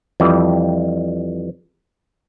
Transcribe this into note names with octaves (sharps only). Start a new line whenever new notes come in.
F2 E3 G3